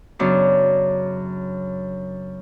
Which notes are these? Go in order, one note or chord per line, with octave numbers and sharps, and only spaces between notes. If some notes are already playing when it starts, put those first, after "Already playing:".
F#2 C#3 F#3 B3 D4